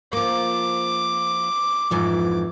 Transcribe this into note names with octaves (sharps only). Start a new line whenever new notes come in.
F3 A#3 D6
F2 G#2 E3 F3